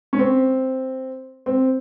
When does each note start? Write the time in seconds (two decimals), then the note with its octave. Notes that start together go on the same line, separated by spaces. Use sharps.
0.13 C#4
0.19 C4
1.46 C4